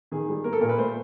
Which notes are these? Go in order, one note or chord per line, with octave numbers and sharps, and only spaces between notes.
D#3 G#4
G3
A#3 A#4
A4
A#2 A#4
B4
A3 C5